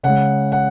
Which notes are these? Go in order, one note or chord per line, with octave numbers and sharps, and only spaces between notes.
C#3 G#3 F#5
F#5